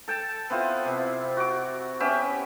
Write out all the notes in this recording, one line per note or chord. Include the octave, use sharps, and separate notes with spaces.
A4 G5 A5
B3 C4 E4 F4
C3
F#4 D6
B3 C#4 G4 E5